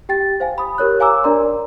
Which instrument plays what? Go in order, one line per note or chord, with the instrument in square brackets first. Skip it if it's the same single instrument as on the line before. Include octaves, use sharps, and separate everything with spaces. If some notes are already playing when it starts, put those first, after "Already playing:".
[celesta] G4 G5 A6
C5 F5 G#5
B5 D#6
G4 A#4 C#5 F#6
C#5 F5 G#5 A#5 D6 E6
D4 A#4 D5 A#5 C6